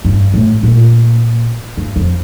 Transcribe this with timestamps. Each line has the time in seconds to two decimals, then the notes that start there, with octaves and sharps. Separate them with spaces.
0.05 G2
0.34 A2
0.63 A#2
1.77 G2
1.96 F2